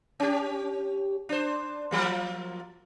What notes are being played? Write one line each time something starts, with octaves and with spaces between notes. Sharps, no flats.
C#4 G4
D4 C5
F3 F#3 A#3